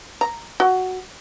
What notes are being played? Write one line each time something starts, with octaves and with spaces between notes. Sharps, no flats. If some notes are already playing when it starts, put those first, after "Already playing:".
A#5
F#4